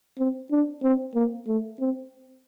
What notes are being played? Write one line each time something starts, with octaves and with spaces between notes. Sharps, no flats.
C4
D4
C4
A#3
A3
C4